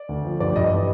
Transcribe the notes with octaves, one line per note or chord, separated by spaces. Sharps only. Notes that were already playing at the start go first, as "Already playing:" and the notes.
Already playing: D5
D2
F3
G2 D5
G2 D#5
E3